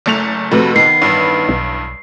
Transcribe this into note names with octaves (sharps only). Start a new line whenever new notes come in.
F#1 A3 F7
F2 C3 A3 F#4 B4
D#3 B3 C7
A1 G2
B1